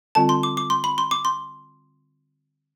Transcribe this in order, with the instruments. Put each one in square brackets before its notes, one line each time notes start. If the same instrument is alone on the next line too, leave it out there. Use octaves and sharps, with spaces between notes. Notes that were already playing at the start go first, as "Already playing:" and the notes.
[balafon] D3 G3 C4 F4 [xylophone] A5
[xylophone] C6
D6
D6
C6
B5
C6
D6
C6